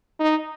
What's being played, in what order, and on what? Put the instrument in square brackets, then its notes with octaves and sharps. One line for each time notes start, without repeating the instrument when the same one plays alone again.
[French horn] D#4